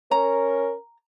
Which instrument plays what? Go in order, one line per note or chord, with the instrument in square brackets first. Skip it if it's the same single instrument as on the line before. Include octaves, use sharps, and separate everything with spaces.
[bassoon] C#4 [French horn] A#4 [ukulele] A#5